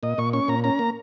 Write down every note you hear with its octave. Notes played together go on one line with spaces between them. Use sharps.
A#2 D#5
A#2 C#6
C#4 C#6
A#2 A#5
C#4 A#5
A#3